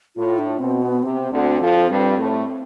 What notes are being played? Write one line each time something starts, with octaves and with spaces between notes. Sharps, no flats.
A2 F4
D4
B2 C4
B3
C3 C4
D2 D3
F2 F3
G2 G3
A2 A3